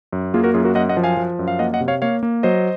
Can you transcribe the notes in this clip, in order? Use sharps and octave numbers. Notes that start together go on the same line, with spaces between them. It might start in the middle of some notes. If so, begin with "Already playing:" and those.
F#2
A#3 F4 G#4
F#4 A#4
F#2 F4 G#4
F#4 A#4
F#2 D#5 F#5
D#5 F#5
F3
F5 G#5
F3
F#2
F5
A#3 D#5 F#5
D#5 F#5
C3
C#5 F5
A#3 C#5 F5
A#3
F#3 C5 D#5